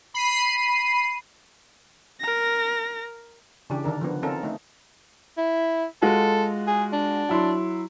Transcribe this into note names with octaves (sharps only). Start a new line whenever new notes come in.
B5 C7 D#7
A#4 A#6
C#3 E3 D4 G4
D3 D#3 D4 A#4
F3 B3
C4 C#4 D#4 F4 A4 A#4
A3 D#4
E4
G#3 F4 F#4 A4
G#4
D4
F#3 E4 C6